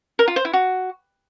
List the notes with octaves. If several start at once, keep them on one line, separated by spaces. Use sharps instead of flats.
A#4
F4
C5
E4
F#4